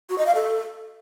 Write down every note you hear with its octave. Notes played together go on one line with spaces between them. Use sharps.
F#4
D#5
F5
A4